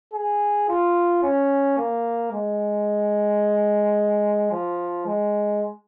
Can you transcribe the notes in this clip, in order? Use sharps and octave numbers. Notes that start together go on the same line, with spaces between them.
G#4
F4
C#4
A#3
G#3
F3
G#3